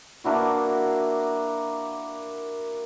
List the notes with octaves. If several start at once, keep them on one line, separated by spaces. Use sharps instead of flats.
A#3 D4 E4 F#4